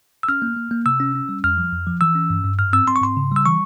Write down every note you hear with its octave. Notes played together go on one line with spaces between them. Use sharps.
E6
C#4 F6
A#3
A#3
A#3
C3 E6
C#4
C#4
G3
F2 F6
F3
F2
F3
E3 E6
C#4
G2
G2
G#2 F6
C4 E6
C4 C6
C#6
G#2 C6
C#3
G3 E6
E3 C#6